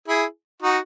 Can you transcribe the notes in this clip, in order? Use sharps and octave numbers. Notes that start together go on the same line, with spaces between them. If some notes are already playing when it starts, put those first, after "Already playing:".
E4 G#4
D#4 F#4